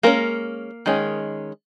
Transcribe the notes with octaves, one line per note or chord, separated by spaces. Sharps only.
G#3 A#3 C#4 A#4
D#3 G#3 C#4